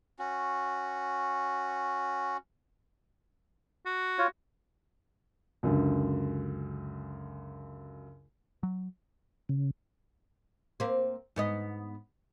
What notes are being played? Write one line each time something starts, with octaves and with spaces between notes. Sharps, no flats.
C#4 F#4
F#4
F4 C#5
C#2 F#2 D3
F#3
C#3
A#3 C4
G#2 B3 D#5